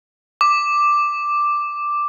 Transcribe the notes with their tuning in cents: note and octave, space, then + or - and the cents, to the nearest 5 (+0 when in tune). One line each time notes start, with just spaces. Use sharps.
D6 +5